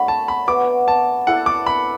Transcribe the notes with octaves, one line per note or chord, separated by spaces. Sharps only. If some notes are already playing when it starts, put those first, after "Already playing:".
Already playing: F#3 A3 D4 F#4 D5 B5
A5
B5
B3 F#4 B4 E5 D6
A5
E4 A4 D5 F#5
D6
B5